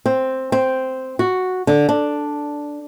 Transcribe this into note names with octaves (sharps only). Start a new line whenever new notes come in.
C4
C4
F#4
D3
D4